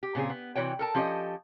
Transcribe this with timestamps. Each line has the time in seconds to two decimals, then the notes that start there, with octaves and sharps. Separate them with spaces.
0.03 G4
0.15 A#2 C#3 C4 G#4
0.29 B3
0.55 C3 E3 F#4 C#5 G5
0.79 A4 A#4 A5
0.95 F3 C#4 G4 A4 C#5 D#5